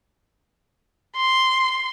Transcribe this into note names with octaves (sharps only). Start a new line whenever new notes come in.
C6